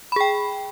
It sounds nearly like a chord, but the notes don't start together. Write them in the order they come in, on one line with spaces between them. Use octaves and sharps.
B5 G#4 G5